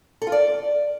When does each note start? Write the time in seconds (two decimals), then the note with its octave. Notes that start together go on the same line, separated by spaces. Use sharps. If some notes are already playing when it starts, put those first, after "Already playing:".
0.22 A4
0.27 F4
0.32 D5